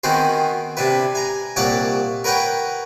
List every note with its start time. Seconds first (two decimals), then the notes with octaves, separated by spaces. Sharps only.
0.03 D#3 B3 C4 F#4 G#4 C5
0.77 C3 D4 E4 B4
1.15 G#5 A#5
1.56 C2 A#2 C#5 D5 F#5 A5
2.24 A#4 B4 C#5 F#5 G5